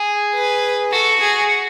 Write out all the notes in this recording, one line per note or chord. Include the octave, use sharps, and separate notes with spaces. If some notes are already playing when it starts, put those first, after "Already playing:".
Already playing: G#4
B4
F#4 A4
G#4